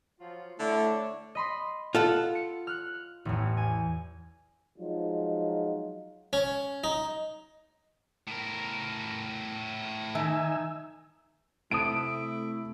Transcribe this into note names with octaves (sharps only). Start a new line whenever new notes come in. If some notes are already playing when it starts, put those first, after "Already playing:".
F3 F#3 F4
D3 A3 D4 E4 C#5
D#5 B5 C6
F4 A4 F#5
C#7
F6 F#6
A1 E2
G#5
F3 F#3 G#3 D#4 F4
C#4
D#4
A2 A#4
D#3 D#4 E5 G#5 E6
C3 A3 E4 F#5 A5 D#6 D7